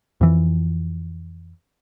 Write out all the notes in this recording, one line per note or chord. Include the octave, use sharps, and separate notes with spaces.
F2 E3